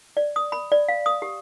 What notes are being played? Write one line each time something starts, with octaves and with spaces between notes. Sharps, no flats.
D5
D#6
B5
D5
F5
D#6
G4